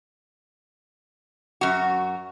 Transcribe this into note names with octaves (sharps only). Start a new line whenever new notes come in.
F#2 F#4